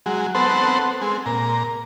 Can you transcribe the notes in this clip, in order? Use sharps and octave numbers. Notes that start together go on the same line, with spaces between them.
F#3 G#3
B3 C4 A4 C5 F#5
G#3 C4
A#2 A#5